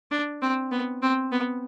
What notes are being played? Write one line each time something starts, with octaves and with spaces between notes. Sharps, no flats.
D4
C4
B3
C4
B3